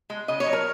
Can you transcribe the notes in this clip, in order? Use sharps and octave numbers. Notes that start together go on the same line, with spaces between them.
G#3
C#3 D#5
C#5
F#3
A#4